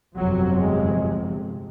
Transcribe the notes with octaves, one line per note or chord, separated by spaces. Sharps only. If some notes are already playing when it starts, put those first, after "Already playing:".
G1 F2 C3 F#3
G#3